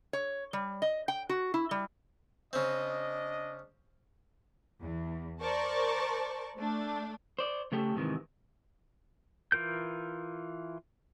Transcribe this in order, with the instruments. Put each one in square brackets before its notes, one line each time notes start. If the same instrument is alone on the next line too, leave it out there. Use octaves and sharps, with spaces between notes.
[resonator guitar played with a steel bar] C#5
G3
D#5
G5
F#4
E4
G3
[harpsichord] C#3 C4 [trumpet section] D4 D#5
[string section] E2
A#4 C5 D5 A5 C#6
A3 D4
[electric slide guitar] C5 D5
C#3 A3 G4 A4
G#2 C3 D#3 E3
[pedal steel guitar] E3 F4 A#4 G6